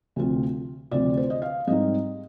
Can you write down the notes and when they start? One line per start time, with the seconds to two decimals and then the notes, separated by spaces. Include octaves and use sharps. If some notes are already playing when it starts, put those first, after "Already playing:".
0.16 D2 C3 F3 C4 F4
0.91 D2 C3 F3 C4 F4 D5
1.17 C5
1.30 D#5
1.42 F5
1.67 G#2 G3 C4 D#4 D#5